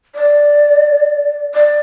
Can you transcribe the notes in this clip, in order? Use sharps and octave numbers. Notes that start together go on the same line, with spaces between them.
D5
D5